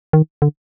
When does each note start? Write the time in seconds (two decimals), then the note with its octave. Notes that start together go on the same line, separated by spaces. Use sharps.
0.13 D#3
0.42 D3